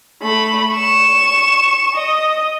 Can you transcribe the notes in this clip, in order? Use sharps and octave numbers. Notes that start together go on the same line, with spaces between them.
A3 B5
C#6 E7
D#5